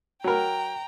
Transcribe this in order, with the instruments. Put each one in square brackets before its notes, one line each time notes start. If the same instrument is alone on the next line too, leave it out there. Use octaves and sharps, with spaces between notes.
[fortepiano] F#3 A#4 [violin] G5 A#5